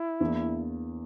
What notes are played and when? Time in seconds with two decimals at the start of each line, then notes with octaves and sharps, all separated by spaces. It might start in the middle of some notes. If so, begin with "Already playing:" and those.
Already playing: E4
0.20 E2 E3 A#3 D4